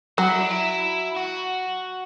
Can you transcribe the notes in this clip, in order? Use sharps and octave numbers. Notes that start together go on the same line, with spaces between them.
F#3 F#4
E4
D4
E4
F#4